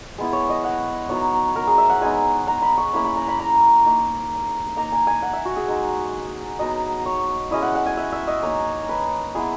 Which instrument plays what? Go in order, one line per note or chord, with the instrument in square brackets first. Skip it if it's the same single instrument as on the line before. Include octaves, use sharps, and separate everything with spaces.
[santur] G#3 B3 E4
C#5
D#5
F#5
F#3 B3 D#4 C#5
A#4
G#4
E5
F#5
G#3 B3 D#4 G#5
A#5
B5
C#6
A#3 C#4 E4 B5
B5
A#5
B5
A#5
A#3 D#4
A#3 D#4 A#5
G#5
G#5
F#5
E5
F#4
G#4
G#3 D#4
F#3 B3 D#4 D#5
C#5
G#3 C#4 E4 D#5
F#5
F#5
G#5
E5
E5
D#5
A#3 D#4 C#5
B4
G#3 B3 E4 G#4